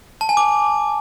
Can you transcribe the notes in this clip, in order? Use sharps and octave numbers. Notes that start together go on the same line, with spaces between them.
A5
G#5
D6